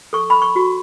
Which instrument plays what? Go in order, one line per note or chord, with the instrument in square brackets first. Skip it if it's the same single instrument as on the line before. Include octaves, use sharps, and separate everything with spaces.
[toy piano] A4 C#6
B5
C#6
F#4